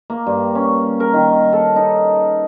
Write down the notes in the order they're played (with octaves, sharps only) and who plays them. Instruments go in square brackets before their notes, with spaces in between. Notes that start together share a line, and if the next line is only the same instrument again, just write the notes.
[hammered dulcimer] A#3
G2
C#4
A#4
D#3
A4
D#4